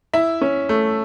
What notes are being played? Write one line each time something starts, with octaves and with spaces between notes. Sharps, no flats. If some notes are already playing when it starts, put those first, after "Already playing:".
E4 E5
C#4
A3